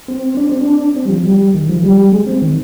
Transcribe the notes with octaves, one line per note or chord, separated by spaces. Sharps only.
C4
D4
C4
D4
C4
G3
F3
G3
D#3
F3
G3
G#3
C4
D#3